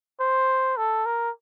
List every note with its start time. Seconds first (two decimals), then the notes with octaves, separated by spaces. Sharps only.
0.20 C5
0.77 A4
1.06 A#4